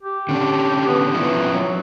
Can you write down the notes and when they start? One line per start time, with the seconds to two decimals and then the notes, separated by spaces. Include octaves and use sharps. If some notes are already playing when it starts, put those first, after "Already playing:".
0.03 G4
0.29 D3 C#4 D4
0.87 B3
1.15 F3 B3 C#4 E4
1.54 F#3